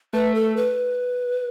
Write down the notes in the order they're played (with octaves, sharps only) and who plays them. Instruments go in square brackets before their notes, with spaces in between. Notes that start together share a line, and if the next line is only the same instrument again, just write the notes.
[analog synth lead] A3 [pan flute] B4
[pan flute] A4
B4